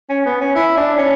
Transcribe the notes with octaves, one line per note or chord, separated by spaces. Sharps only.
C#4
B3
C#4
E4
D4
C#4